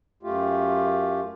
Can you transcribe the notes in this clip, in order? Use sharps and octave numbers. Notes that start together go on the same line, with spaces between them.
F#2 A3 F4 G4